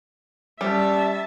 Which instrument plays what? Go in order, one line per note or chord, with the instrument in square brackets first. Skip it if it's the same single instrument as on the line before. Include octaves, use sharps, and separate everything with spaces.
[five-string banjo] G3 [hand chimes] C#4 G4 D5 [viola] E5 A5